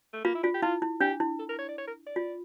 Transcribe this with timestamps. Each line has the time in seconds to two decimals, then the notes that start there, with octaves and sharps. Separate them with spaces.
0.13 A3
0.24 A#3 F4
0.35 E4
0.43 D4 F4
0.54 G4
0.62 E4 F4
0.82 E4
1.01 D4 G4
1.20 E4
1.39 A4
1.49 A#4
1.59 C#5
1.69 D5
1.78 C#5
1.87 A#4
2.07 D5
2.16 F4